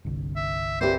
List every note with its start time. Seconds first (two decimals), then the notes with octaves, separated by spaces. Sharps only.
0.05 G1 C2 D3
0.36 E5
0.81 D2 A#2 E3 C4 G4 C5